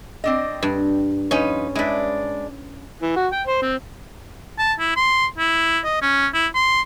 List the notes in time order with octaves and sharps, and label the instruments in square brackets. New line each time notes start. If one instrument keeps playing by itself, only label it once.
[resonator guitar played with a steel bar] C4 D4 D#5
[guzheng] G2
[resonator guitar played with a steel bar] F3 D#4 B4 [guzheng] C#4
[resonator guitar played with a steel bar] G#3 D4 [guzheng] E4 B4
[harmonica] E3
F#4
G5
C5
C4
[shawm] A5
E4
C6
E4
D#5
C#4
E4
C6